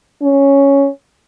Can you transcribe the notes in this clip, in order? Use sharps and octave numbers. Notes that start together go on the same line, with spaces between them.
C#4